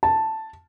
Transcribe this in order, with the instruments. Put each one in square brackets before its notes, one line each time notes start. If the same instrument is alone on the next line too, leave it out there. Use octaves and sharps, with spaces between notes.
[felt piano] A5